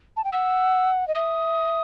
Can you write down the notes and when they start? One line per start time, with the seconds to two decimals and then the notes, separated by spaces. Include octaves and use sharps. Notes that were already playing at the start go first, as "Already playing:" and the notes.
0.17 A5
0.24 G5
0.32 F#5 E6
1.08 D#5
1.15 E5 D#6